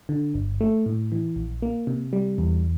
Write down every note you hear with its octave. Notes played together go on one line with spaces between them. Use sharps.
D3
G1
A3
A2
E3
A#1
A#3
C3
G3
E2